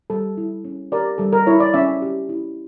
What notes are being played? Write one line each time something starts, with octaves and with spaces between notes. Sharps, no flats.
G3 A4
E4
C#4
G4 A#4 D5
G3 A4
A#4
E4 C#5
D5
C#4 C#5 E5
G4
E4